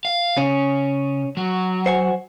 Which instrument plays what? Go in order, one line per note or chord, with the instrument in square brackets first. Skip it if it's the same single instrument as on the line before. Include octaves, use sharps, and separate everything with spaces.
[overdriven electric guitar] F5
[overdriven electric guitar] C#3 [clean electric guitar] C#4
[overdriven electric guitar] F#3
[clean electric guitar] C5 F#5 G#5